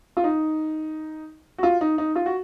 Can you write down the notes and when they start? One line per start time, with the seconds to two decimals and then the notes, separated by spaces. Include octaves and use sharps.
0.17 F4
0.24 D#4
1.58 F#4
1.63 F4
1.81 D#4
1.98 D#4
2.15 F4
2.26 F#4